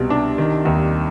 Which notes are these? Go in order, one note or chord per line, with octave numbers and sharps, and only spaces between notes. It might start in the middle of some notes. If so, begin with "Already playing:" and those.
Already playing: C2 B2
D4
D#3
D#2